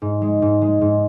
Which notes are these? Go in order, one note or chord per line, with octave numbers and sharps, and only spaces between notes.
G#2
G#3
G#2
G#3
G#2